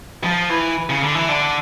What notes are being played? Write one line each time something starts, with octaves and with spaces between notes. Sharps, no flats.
F3
E3
C#3
D3
E3
D3